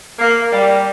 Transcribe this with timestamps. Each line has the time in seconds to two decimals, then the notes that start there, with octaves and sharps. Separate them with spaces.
0.19 A#3
0.53 G3